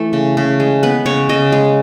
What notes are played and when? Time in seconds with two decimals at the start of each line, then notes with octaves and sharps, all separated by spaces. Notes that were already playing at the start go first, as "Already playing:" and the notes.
Already playing: E3 A3
0.13 C#3
0.37 C#3
0.60 G#3
0.83 B3 B4
1.06 C#3 C#5
1.29 C#3 D#5
1.52 G#3